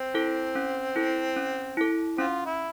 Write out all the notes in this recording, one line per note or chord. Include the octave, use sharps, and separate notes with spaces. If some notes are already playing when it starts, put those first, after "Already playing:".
Already playing: C4
E4 A4
C#4
E4 A4
C#4
E4 A4
C4 C#4 F4
E4